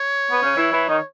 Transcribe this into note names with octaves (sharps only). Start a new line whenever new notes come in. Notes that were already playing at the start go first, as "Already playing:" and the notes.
Already playing: C#5
B3
C#3 C#4
E3 E4
E3 E4
D#3 D#4